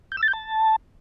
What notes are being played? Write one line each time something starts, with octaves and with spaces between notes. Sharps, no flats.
G6
E6
A6
G6
A5